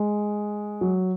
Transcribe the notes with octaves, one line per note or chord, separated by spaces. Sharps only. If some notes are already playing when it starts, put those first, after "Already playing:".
Already playing: G#3
F#3